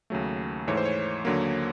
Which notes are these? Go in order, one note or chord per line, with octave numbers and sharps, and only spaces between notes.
D#2 C#3 F#3 A3
G#2 E3 A3 C#5
C5
C#5
D#2 D3 F#3 A#3